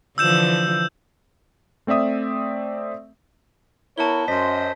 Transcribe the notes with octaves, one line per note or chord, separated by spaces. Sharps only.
D3 E3 F3 E6 G6 E7
A3 C4 D5 E5 D#6
B3 E4 A#4 C#5 A5 G7
F#2 C5 D#5 B6